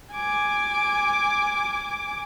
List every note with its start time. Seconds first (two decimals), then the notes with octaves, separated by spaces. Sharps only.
0.13 G#5 D6